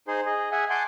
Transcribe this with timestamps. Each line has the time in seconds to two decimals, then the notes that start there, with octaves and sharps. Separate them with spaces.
0.08 D#4 G#4 C5 C6
0.26 G#4 D#5
0.52 G#4 E5 F#5 G#5
0.70 F#5 G#5 A5 C6 D6 G6